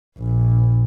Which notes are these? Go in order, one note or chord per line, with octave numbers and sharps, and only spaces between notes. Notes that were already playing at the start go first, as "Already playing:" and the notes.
A#1